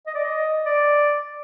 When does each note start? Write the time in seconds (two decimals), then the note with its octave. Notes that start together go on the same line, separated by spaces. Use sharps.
0.07 D#5
0.15 D5
0.24 D#5
0.66 D5